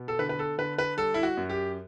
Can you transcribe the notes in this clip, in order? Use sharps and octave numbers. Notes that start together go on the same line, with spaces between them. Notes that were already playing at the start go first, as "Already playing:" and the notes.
Already playing: B2 B3
A4
D3 B4
B4
A4
D3 B4
B4
G3 A4
E4
F#4
F#2
G4